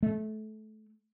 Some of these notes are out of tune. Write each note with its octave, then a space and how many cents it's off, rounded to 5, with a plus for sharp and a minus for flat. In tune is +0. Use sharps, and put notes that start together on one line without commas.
A3 -25